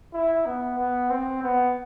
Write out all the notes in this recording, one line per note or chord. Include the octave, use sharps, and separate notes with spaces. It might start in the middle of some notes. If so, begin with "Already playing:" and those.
E4
B3
B3
C4
B3